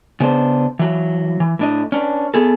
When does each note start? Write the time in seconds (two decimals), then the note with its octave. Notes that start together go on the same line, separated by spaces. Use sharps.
0.20 C#3 B3 D4 C5
0.79 E3 F#3
1.40 E3
1.59 A2 D4 D#5
1.92 C#4 D4 B4
2.34 B3 G#4 A4